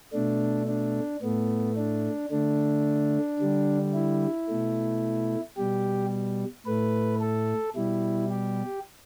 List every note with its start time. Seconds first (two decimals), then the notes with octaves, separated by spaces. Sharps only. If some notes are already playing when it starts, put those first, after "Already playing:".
0.13 B2 A3 D4
0.67 D4
1.22 A2 A3 B3
1.77 D4
2.31 D3 A3 D4
3.39 D3 G3
3.94 E4
4.49 B2 A3
5.57 B2 G3 G4
6.66 A2 A3 B4
7.20 A4
7.76 B2 G3 E4
8.30 G4